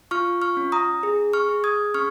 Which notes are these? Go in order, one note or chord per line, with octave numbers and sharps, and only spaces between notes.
F4 C#6 F6
C#6 F6
C#4
A#5 D#6
G#4
C#6 F6
G#4
D#6 G#6
C#4 C#6 F6